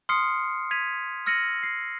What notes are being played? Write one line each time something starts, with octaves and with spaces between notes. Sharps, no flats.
C6 D#6 F6 C7 C#7
G#6 B6 D#7 F7
E6 F6 A#6 C#7 D#7 F#7
C7